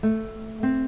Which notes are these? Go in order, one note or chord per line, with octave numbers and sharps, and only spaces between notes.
A3
C4